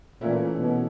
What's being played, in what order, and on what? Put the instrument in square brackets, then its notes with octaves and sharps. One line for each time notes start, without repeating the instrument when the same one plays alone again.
[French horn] A#2 [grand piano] E3 A3 C#4 E4
[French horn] B2